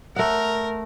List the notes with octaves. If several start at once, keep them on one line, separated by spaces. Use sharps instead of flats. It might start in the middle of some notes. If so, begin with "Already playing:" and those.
A3 A#4 F#5